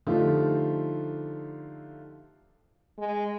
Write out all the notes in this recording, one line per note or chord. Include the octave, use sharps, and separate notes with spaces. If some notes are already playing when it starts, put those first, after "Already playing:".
D3 F3 A3 D#4 F4 G4
G#3